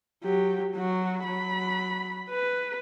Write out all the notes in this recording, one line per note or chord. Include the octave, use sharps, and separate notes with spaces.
F#3 G4
F#3 F#4
F#3 B5
B4